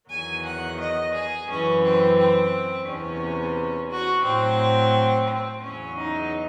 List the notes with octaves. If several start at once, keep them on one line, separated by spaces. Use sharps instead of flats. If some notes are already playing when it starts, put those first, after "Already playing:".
E2 D#3 F#3 G#5
F#5
D#5
G#4
F#2 E3 C#4
C4
C4
E2 C3 E3 C#4
F#4
A2 F#3 C4
C4
E2 C#3 F#3 C#4
D#4